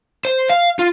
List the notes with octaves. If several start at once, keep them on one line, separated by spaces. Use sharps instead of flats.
C5
F5
F4